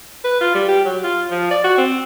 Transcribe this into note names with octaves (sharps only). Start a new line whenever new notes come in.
B4
F4
G3
G4
F#3
F4
F3
D5
F#4
C4